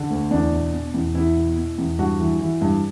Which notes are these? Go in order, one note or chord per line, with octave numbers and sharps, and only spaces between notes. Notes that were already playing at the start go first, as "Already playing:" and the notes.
Already playing: D3
D2
E2 D4
B2
B2
E2
E2 E4
B2
B2
E2
G2 F#4
E3
E3
G2